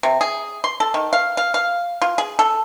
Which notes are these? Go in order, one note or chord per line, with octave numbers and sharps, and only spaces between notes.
C3
G#4
C6
A4
D#3
F5
F5
F5
F4
G#4
A4